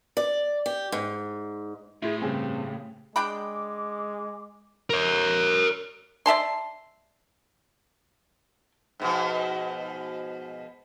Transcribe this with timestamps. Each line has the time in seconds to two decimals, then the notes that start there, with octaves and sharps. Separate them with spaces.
0.17 D5
0.66 G4
0.92 G#2
2.02 A2 E4 F4 G#4
2.22 G2 C#3 C4 G4 G#5
3.16 G#3 D4 G5 B5 D6
4.90 A#4 C#5
6.26 D5 E5 A5 C6
9.00 G#2 B2 F3